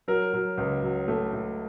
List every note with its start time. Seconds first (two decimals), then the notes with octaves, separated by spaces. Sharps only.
0.08 F#3 A#4
0.34 F#3
0.57 C#2
0.83 F#3
1.08 A3
1.33 A3